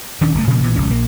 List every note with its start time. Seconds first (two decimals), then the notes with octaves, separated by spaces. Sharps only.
0.21 D#1 D#3 C#4 D4
0.35 F#1 C#3 A3
0.47 A#2 C#3 F3 A#3
0.62 A#1 A#2 E3 B3
0.76 E1 C#2 C#4
0.90 A#1 A#3